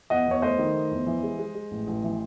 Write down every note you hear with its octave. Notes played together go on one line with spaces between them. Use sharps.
E2 D#5 F#5
E2 C#5
A3 C5 D#5
D#3
A3
E2
E3
G#3
G#3
G#3
A1
A1
E3